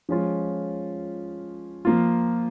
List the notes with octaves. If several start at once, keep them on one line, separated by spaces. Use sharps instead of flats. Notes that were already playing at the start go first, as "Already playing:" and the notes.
F3 G#3 C#4 F4
F3 A#3 F4